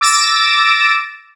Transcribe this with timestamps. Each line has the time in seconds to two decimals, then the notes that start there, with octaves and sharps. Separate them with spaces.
0.01 D6 E6 A6 A#6 D7 E7